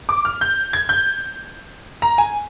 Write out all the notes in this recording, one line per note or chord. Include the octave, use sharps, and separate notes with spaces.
D6
F6
G6
G#6
G6
A#5
G#5